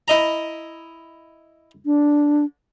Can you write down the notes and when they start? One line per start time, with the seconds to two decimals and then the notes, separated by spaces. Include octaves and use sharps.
0.08 E4 D#5 A#5
1.86 D4